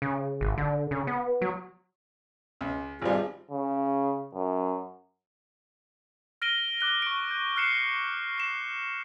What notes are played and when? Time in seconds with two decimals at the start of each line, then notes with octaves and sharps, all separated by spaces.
0.02 C#3
0.41 G#1
0.58 D3
0.91 C#3
1.07 B3
1.42 F#3
2.61 C#2
3.02 G#1 G3 C4 F4 G#4
3.51 C#3
4.34 F#2
6.42 F6 A#6 D7 D#7 G7
6.81 D6 F#6 G7
7.02 C#6 D7
7.31 G6
7.56 F6 F#6 C7 C#7 E7 G7
8.38 C7 D7 E7